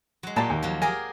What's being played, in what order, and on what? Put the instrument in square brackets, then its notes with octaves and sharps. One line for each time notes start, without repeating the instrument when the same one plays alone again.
[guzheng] F#3 G#3
[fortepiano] A#2 A5 [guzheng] A#3 G4
[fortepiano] D#2
[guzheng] F3 F#3
[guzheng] G4 G#4 A#4 [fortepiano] G#5